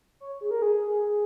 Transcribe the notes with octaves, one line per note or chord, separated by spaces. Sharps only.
C#5
G#4
A#4
G#4
G#4